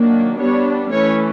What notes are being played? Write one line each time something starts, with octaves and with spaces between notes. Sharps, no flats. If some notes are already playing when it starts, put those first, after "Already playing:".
Already playing: D#3 F#3 A#3 D4
G3 B3 D4 C#5
E3 A3 C#4 C#5